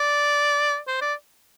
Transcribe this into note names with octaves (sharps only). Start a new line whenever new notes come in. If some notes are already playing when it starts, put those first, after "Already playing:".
Already playing: D5
C5
D5